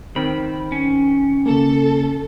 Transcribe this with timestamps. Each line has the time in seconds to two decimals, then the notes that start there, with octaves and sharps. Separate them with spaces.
0.16 D#3 C4 B5
0.72 C#4
1.46 C#3 A#3 A4